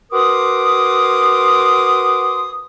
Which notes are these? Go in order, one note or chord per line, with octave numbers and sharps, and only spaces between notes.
F#4 A#4 B4 C6 D6 D#6